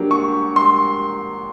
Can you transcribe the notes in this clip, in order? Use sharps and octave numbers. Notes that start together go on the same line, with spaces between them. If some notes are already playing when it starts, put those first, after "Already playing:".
Already playing: F#3 A#3 D4 G4
C#6
C6